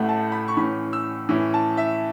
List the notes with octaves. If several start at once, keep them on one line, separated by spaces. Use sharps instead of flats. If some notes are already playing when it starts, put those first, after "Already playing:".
Already playing: A1 A2 A3 E4 F#5
A5
B5
C#6
A2 E3 C#4 B5
E6
A2 E3 C#4 E4
A5
E5